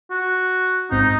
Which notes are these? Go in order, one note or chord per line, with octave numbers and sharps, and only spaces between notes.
F#4
G#1 G#2 C4 D#4